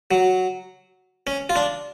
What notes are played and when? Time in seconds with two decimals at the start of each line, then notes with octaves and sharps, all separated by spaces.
0.11 F#3
1.27 C#4
1.49 F4
1.56 D4